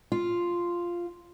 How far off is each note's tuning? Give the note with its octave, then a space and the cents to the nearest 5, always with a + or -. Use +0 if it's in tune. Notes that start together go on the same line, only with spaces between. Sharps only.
F4 -5